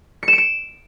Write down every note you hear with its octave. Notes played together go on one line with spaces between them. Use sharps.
C#7
E7
D7
E7